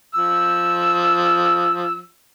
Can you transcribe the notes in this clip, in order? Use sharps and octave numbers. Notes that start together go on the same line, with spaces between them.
F3 E6